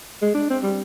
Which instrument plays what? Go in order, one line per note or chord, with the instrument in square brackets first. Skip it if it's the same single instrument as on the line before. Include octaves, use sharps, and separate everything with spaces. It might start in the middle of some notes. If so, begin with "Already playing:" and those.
[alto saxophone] G#3
D4
C4
G3